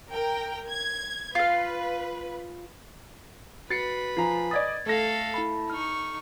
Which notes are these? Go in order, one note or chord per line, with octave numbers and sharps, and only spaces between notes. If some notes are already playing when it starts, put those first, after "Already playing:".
A#4 G5
G#6
F4 B4 F5
F#4 B4 A6 C7 C#7
F3 G#5 A#5 C7
D5 D#5 D#6 G#6 A6
A3 A4 F5 A#6
E4 A5 B5
D#4 C#6 F6